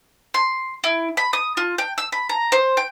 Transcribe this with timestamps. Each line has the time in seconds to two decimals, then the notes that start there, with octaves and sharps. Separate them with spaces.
0.34 C6
0.84 E4
1.17 B5
1.33 D#6
1.57 F4
1.78 G5
1.98 E6
2.12 B5
2.29 A#5
2.52 C5
2.77 G5